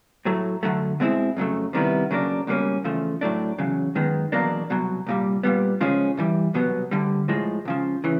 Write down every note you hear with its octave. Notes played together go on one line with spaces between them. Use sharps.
A2 F#3 A3
F#2 D3 F#3 A3
B2 G#3 C4 E4
F2 C#3 F#3 A3
C3 D#3 G3 B3 E4
C#3 F#3 A#3 D4
C#2 B2 G3 A#3 C#4
E2 C#3 F3 A3
A2 F#3 A3 D4
E2 C#3 F#3
F#2 D#3 G#3 B3
E2 B2 F#3 A#3 D4
C2 B2 F#3
C2 A#2 G3
A#2 G3 B3
C#3 F3 G#3 C#4
G2 E3 G3
C2 B2 F#3 B3
D2 D3 G3
A2 F3 G#3
C#2 C#3 F3
C#3 E3